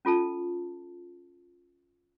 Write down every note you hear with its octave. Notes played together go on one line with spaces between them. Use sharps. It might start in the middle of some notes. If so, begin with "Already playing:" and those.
C#4 F4 A4 A5